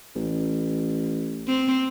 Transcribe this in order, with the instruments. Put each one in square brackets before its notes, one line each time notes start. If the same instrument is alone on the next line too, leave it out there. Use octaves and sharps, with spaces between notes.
[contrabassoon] A1
[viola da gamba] C4